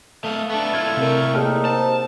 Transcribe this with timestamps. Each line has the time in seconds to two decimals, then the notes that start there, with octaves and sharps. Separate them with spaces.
0.24 A3 A4 F5 D#6
0.50 B3 D4 A4 E5 C#6
0.74 A2 F4 G#6
0.97 C3 A#4
1.35 A#3 D#4 G4 G#4
1.65 C5 A5